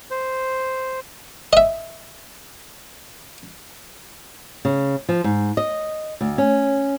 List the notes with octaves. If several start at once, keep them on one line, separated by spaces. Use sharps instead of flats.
C5
D#5 E5
C#3
F3
G#2
D#5
D2
C#4